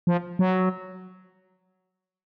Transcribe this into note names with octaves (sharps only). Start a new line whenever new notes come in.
F3
F#3